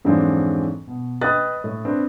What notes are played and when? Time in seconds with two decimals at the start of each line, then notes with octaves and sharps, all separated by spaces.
0.05 F2 G#2 E3 F#3 C4 D4
0.87 B2
1.21 B4 D#5 G5 D#6 F#6 A6
1.64 A2
1.85 C4 D4 B4